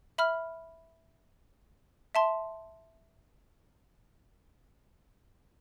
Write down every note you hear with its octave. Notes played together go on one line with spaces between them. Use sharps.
E5 B5 F6
E5 A5 C6